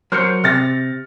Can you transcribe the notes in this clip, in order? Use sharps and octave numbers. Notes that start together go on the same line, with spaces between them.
F#3 A#4 C5 F6 G6 C#7
C3 F6 A6 A#6